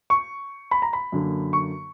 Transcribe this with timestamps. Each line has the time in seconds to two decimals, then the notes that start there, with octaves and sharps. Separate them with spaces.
0.10 C#6
0.71 B5
0.82 A#5
0.93 B5
1.12 F#2 D3 A#3
1.53 C#6